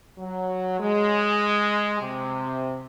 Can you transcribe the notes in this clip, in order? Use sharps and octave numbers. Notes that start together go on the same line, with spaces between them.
F#3
G#3
C3